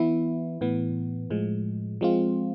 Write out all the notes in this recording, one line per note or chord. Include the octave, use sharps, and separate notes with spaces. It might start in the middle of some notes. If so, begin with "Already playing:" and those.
Already playing: E3 B3 E4
A2 E3 B3
A2 F3 G#3
F3 G#3 C4 F4